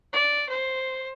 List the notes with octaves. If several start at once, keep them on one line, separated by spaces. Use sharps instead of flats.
D5
C5